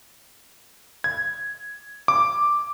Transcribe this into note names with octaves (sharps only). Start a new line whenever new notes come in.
G#6
D6